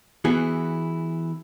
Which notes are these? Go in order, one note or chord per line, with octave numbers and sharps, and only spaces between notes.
E3 B3 E4 F#4 G#4